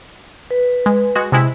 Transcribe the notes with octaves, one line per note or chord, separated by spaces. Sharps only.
B4
G#3
G#3 F#4
C3 G#3 E4